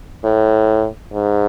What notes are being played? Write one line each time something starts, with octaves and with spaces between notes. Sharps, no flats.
A2
G#2